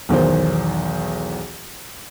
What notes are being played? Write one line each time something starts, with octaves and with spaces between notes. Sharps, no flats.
B1 E2 D#3 C5